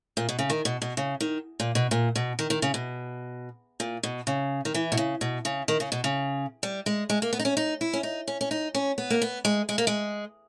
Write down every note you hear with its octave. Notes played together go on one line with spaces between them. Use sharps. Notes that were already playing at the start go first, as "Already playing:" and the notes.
A#2
B2
C#3
D#3
B2
B2
C#3
D#3
A#2
B2
A#2
B2
D#3
D#3
C#3
B2
A#2
B2
C#3
D#3
E3
B2
C#3
B2
C#3
D#3
C#3
B2
C#3
G3
G#3
G#3
A#3
B3
D#4
C#4
D#4
E4
C#4
D#4
C#4
C#4
D#4
C#4
B3
A#3
B3
G#3
G#3
A#3
G#3